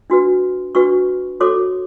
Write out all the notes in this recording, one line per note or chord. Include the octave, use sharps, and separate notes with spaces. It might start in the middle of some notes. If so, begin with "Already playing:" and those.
D4 F#4 B4
D4 F#4 B4 C#6
F#4 A4 C#5 D6